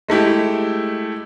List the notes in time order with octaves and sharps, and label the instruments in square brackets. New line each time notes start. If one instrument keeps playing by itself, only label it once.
[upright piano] G#3 A3 E4 G4